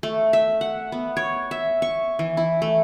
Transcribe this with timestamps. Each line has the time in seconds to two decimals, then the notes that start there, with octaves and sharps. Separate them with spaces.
0.03 A3
0.33 E5
0.61 F#5
0.92 B3
1.17 C#5
1.51 E5
1.82 C#6
2.19 E3
2.37 E4
2.62 A3